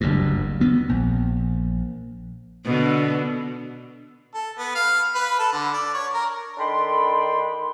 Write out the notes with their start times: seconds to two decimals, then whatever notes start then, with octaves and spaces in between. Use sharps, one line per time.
0.01 F#1 D2 G2
0.60 D2 B3
0.89 A#1
2.65 B2 D3
4.35 A4
4.58 B3
4.75 F5
5.15 B4
5.39 A4
5.53 D3
5.74 D5
5.94 C#5
6.14 A#4
6.58 D#3 D4 A4 G5 B5 C6